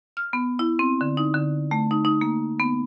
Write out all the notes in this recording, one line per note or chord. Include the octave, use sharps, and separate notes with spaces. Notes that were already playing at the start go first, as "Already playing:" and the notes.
F6
B3
E4
C4
D3
D#4
D3
A3
D#4
D#4
A#3
B3